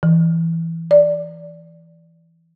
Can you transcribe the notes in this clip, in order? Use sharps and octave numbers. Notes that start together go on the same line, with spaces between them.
E3
D5